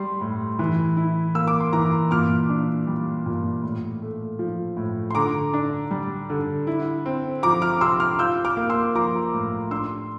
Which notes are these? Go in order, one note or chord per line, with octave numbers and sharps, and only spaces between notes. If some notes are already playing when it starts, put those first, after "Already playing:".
Already playing: G3 C6
A2
E3
E4
A#3 E6
D6
C6
E3 A#5 D6
A#2 D6 F6
D4
G3
A#2
A2
A3
F3
A2
C6
D3 A#5 D6
D4
G3
D3
E4
C4
F3 A#5 D6
D6 F6
C3 C6 E6
D6 F6
F4 E6 G6
D6 F6
A#3
C6 E6
F3 A#5 D6
A2
D4 C6 E6